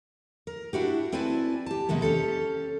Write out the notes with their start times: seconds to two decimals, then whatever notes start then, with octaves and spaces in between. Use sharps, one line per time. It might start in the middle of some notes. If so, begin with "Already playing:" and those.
0.47 A#4
0.73 D4 E4 F#4 G4
1.12 C4 E4 B4 D5 G#5 A5
1.66 G4 A5
1.88 C3 E3 G#3 A#3 B3
2.02 C#4 G4 A4